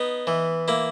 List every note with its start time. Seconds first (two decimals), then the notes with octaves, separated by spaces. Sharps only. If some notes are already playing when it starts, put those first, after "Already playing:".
Already playing: B3 D#4
0.27 E3
0.68 A#3 E4